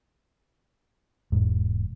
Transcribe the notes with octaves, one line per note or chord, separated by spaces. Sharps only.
E1 G#2